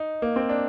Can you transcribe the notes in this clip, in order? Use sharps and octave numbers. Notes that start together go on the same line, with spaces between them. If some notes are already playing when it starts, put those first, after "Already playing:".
Already playing: D#4
A#3
C4
D4